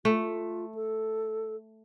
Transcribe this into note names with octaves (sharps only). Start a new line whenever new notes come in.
A3 F4
A4